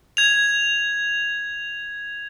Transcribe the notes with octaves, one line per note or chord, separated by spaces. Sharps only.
G#6 F7